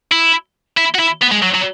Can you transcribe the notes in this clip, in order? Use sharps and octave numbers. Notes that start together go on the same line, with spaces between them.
E4
E4
F#4
E4
B3
G#3
F#3
F#3